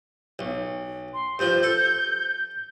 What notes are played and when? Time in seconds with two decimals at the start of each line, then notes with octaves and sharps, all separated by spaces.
0.39 B1
1.14 C6
1.39 G2 F3 G6
1.63 A4